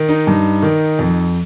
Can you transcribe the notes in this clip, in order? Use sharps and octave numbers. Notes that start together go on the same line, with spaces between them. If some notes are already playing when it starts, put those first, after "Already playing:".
Already playing: D#3
D#4
G2
D#3
F2